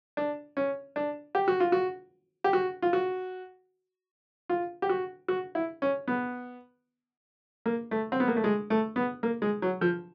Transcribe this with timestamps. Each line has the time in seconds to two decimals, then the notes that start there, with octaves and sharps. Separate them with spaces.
0.17 D4
0.57 C#4
0.96 D4
1.35 G4
1.48 F#4
1.60 F4
1.72 F#4
2.44 G4
2.53 F#4
2.82 F4
2.93 F#4
4.49 F4
4.82 G4
4.89 F#4
5.28 F#4
5.55 E4
5.82 C#4
6.08 B3
7.66 A#3
7.91 A3
8.12 C4
8.20 B3
8.28 A#3
8.36 A3
8.44 G#3
8.70 A3
8.96 B3
9.23 A#3
9.42 G#3
9.62 F#3
9.81 F3